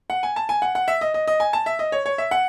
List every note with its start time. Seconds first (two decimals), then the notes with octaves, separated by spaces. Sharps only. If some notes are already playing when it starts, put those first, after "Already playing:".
0.10 F#5
0.23 G#5
0.36 A5
0.49 G#5
0.62 F#5
0.75 F#5
0.88 E5
1.01 D#5
1.14 D#5
1.28 D#5
1.40 G#5
1.53 A5
1.66 E5
1.79 D#5
1.92 C#5
2.06 C#5
2.18 E5
2.31 F#5